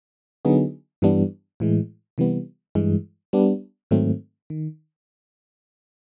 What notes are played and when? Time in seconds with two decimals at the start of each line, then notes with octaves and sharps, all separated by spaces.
0.45 D3 F#3 B3 D#4 G#4
1.02 G2 E3 G3 B3 D4
1.60 A2 E3 G#3
2.18 C3 E3 G3 B3
2.75 G2 E3 G#3
3.33 G3 B3 D4
3.91 G#2 D#3 F#3 A3 C4
4.50 D#3